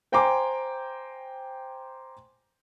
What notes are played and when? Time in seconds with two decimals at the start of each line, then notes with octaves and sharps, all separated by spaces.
0.12 C5 G5 G#5 A#5 C6 D6